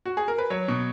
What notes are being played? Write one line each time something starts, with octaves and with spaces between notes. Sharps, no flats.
F#4
G#4
A#4
B4
F#3 C#5
B2